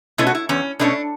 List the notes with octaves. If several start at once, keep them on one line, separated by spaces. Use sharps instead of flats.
B2 A3 C#4 E4
F#4
E4
E2 C#4
B2 A3 C#4 D4